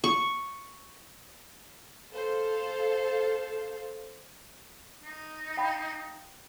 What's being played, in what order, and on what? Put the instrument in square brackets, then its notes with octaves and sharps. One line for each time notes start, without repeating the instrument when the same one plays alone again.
[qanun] C#6
[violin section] A4 C5 F5
[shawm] D#4
[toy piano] F5 G5 B5